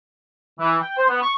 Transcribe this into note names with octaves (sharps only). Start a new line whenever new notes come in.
E3
G5
C5
B3
C#6